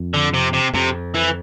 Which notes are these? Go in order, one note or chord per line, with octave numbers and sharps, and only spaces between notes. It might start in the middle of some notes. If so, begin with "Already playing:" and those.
Already playing: F2
D3
C3
C3
F2 C3
E3